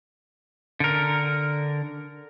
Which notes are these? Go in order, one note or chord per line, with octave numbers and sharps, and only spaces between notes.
D3 A#4